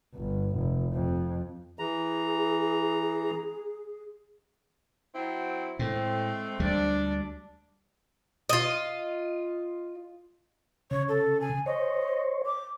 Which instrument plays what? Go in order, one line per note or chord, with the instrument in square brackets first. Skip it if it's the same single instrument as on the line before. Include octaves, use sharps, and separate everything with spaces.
[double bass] G1
F1
F2
[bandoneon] E3 A#5 [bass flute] G#4
[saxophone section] F#3 C4 E4
[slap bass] A2 [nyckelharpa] G#3 [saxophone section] A3 C4
[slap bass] D2 G3 [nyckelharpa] D4 D5
[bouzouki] F4 D#5
[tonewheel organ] C#3 [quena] C#5
[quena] A4
G#5
[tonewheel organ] C5 C#5 [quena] D#5
[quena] D6